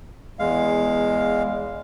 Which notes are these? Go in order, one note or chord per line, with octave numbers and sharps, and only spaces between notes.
E2 G#3 F5